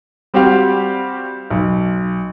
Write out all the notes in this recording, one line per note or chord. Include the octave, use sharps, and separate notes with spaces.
G3 C4 F#4 G4 F5
B1